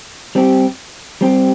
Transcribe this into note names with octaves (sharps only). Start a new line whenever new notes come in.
G3 C4 G4
G3 C4 G4